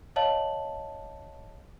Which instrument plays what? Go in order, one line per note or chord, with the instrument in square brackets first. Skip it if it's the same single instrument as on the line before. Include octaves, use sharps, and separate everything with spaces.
[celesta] C#5 D#5 F5 A5 F#7